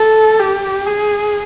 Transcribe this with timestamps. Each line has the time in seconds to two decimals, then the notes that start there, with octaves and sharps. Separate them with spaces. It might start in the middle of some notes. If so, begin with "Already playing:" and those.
Already playing: A4
0.39 G4
0.86 G#4